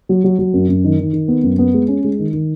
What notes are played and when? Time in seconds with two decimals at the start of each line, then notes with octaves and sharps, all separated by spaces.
0.09 F#3
0.24 F#3
0.39 F#3
0.53 F#2
0.69 F#2
0.84 D#3
0.99 D#3
1.13 D#3
1.28 B3
1.43 F#2
1.58 B3
1.74 G#3
1.88 C#4
2.04 G#3
2.19 D#3
2.33 D#3